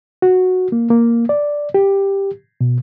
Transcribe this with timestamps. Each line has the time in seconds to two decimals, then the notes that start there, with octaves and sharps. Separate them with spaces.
0.22 F#4
0.72 A#3
0.90 A#3
1.29 D5
1.74 G4
2.61 B2